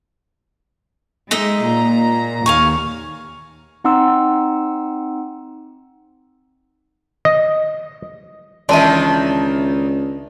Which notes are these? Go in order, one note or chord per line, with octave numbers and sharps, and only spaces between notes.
G#3 D#4 D#5 E5
A#2 A#5
D#2 F5 G#5 C#6
C4 D#4 F#5 C6 D6 E6
D#5
C#2 D#3 E3 D4 E5 A5 C6